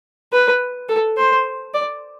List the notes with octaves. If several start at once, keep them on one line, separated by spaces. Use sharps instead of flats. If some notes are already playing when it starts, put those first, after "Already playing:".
B4
A4
C5
D5